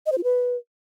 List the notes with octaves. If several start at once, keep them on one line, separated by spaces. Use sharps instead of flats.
D#5
C5
F4
B4